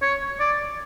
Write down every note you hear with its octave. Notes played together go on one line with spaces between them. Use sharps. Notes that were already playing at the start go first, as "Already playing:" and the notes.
C#5
D5